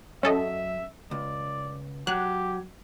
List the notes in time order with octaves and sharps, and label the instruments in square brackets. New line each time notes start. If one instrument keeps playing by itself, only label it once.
[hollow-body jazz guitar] F#2 [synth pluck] C#4 A4 D#5 [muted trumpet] E5
[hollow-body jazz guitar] C#2 [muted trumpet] D5
[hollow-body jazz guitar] F#3 [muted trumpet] G4 [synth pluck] F#6